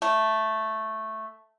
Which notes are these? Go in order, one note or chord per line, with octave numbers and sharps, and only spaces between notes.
A3